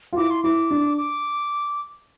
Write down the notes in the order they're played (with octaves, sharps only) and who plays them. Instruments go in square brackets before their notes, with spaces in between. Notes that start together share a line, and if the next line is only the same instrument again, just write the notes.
[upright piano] F4
[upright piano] E4 [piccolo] D6
[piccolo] C6
[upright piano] E4 [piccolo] D6
[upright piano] D4
[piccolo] D6